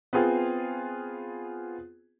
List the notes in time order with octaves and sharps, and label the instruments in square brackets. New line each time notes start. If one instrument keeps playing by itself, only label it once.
[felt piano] B3 C4 F4 G#4